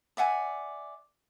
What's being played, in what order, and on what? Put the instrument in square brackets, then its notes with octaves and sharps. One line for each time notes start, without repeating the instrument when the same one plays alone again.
[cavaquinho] D5 E5 F#5 G#5